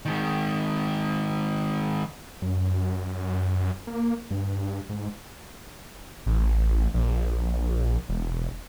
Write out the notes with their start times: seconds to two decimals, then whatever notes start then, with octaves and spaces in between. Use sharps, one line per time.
0.05 D#3 G#3
2.42 F#2
3.87 A#3
4.31 G2
4.90 G#2
6.26 A1
6.94 A#1
8.09 E1